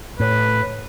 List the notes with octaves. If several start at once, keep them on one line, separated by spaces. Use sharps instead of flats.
A2 B4